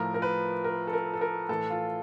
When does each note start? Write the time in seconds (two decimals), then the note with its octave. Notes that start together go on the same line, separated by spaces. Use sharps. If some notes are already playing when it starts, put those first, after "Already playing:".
Already playing: A2 F3 A#4
0.14 A#4
0.22 B4
0.64 A#4
0.87 A4
0.93 A#4
1.13 A4
1.21 A#4
1.49 A2 E3 A4
1.70 F4